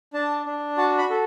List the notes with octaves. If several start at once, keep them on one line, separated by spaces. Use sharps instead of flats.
D4 A5
D4
F#4 A5
B5
A4